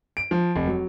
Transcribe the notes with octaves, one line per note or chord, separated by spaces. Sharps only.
D7
F3
F1
F#3